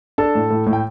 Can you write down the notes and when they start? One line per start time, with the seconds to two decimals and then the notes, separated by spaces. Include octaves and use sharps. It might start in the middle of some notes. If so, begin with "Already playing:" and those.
0.18 D4 A4 A5
0.35 A2
0.50 A2
0.67 A2
0.73 G5